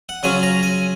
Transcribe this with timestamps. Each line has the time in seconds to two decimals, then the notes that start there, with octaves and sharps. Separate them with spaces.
0.09 F#5
0.23 C#3 F#3 C#4 F4 G#5
0.43 A#5
0.63 G#5